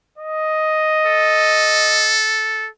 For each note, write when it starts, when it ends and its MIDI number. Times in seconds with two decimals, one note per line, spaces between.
0.18 2.20 75
1.06 2.68 69